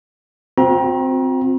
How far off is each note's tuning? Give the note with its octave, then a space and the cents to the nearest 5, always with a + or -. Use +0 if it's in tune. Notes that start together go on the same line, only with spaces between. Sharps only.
C4 +0 F#4 -45 A#5 +35